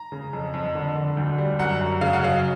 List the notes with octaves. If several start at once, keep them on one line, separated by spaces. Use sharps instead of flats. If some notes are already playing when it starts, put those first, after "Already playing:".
Already playing: A#5
C#3
F2
F2
D3
D3
D2
G3
F#2 F#5
F#2
C#3 F5
F#5
F#3 F5